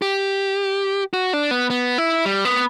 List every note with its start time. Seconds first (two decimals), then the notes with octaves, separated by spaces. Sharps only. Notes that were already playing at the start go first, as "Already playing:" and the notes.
0.02 G4
1.14 F#4
1.33 D4
1.51 B3
1.70 B3
1.98 E4
2.26 G3
2.45 B3